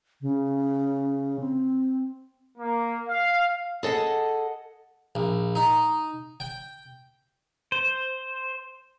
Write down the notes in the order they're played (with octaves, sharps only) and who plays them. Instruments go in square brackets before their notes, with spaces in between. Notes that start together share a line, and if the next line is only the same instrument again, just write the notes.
[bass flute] C#3
C4
[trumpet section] A#3
F5
[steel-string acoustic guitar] G#4 A4 D#5 F#5
[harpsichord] A#1
D#4
G5
[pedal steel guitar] C5